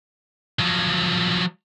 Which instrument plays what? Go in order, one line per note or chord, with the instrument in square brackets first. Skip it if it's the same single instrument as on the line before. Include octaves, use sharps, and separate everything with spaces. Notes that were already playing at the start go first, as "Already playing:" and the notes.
[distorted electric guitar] F3 F#3